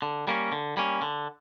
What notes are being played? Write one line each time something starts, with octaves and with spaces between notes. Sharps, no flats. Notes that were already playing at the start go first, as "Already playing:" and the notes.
D3
G3 A#3 C#4
D3
G3 A#3 C#4
D3